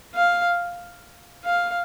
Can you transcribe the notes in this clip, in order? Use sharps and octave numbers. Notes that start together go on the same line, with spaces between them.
F5
F5